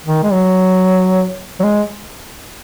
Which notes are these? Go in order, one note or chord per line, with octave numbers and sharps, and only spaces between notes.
D#3
G#3
F#3
F#3
G#3